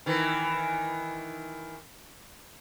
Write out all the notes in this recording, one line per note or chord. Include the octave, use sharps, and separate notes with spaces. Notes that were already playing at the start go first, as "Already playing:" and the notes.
D#3 E3